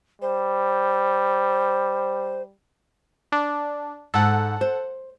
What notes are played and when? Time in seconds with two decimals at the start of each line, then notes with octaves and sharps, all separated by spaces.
0.22 G3 C5
3.32 D4
4.14 G#2 A4 F#5
4.61 C5